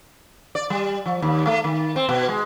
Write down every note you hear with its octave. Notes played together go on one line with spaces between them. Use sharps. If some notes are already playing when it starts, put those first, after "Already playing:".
D5
G3
F3
D#2
A3
D#3
C4
B2
G#3